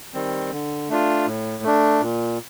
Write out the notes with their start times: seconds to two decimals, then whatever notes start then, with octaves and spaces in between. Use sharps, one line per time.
0.14 D#3 G3 C4
0.51 D3
0.89 A3 D4 F4
1.27 A2
1.63 A3 D4
2.01 A#2